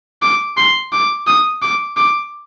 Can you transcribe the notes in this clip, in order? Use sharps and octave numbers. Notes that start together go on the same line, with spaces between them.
D6
C6
D6
D#6
D6
D6